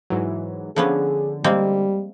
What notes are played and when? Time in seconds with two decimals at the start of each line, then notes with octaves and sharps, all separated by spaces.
0.10 G#2 E3 F#3
0.76 D3 F3 B3 C#4 G#4
1.44 G3 G#3 A#3 C4